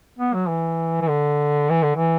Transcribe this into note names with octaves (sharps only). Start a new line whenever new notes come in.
B3
F#3
E3
E3
D3
E3
D3
E3